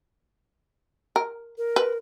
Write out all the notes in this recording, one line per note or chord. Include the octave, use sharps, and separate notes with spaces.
A#4
A#4
B4